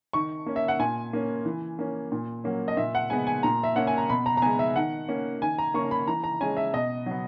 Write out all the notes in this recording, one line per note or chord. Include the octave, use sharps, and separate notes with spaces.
D#3 C#6
A#3 C#4
E5
F#5
A#2 G#5
A#3 C#4
E3
A#3 C#4
A#2
F#3 A#3 C#4
D#5
A#2 E5
F#5
G#3 B3 G#5
G#5
A#2 A#5
E5
A#3 C#4 F#5
G#5
A#5
B2 B5
A#5
A#5
G#3 B3 G#5
E5
D#3 F#5
A#3 C#4
D#3 G#5
A#5
A#3 C#4 C#6
B5
E3 A#5
A#5
G#3 C#4 G#5
E5
B2 D#5
F#3
B3